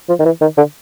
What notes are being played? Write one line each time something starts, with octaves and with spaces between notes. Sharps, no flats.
F3
D#3
E3
D#3
D3